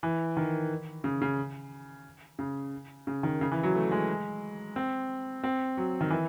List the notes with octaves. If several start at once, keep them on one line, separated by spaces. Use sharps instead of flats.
E3
D#3
C#3
C#3
C#3
C#3
D#3
C#3
E3
F#3
A3
G#3
C4
C4
F#3
D#3
E3